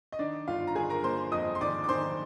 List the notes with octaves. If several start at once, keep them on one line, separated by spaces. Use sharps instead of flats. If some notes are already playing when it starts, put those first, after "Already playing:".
D#5
D#3 D4 D5
G1 F4 F5
A#5
G1 G#4 G#5
A#4 A#5
A#3 C5 C6
F2 D#5 D#6
C6
D#3 D5 D6
D6
D#3 C5 C6